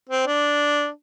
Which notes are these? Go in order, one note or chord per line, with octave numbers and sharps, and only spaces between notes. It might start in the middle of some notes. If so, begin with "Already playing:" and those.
C4
D4